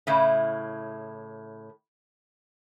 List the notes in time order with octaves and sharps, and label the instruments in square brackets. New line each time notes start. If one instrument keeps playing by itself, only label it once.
[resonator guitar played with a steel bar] A2 C#3 E4